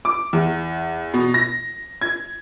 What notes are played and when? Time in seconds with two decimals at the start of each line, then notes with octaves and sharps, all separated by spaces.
0.05 D6
0.33 E2
1.14 B2
1.34 A#6
2.01 G#6